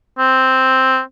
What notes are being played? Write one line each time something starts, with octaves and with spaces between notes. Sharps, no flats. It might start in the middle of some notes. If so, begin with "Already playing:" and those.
C4